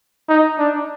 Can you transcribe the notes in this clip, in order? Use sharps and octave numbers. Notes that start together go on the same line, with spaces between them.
D#4
D4